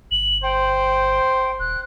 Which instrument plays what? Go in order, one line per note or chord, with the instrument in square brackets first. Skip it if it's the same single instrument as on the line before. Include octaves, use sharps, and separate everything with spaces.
[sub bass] G1 [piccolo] F#7
[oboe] C5 [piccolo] G5
[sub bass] D#1 [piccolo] F#6